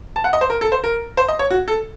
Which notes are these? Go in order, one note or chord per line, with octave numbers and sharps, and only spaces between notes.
A5
F#5
D#5
C5
A#4
A4
C5
A#4
C5
D#5
C#5
F#4
A4